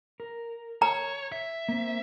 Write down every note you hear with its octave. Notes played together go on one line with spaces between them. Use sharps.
A#4
C#5 A#5
E5
A#3 C4